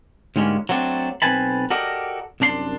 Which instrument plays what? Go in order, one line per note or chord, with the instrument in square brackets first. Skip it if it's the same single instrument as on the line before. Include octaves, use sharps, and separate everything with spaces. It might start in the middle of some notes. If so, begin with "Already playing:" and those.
[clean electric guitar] D2 G#2 G3 G#3 A#3 C#4
F#3 A3 C4 D4
B1 C4 B4 G#5 A5 B5
F#4 G4 A4 A#4 D5 D#5
C2 F#2 D4 A4 C6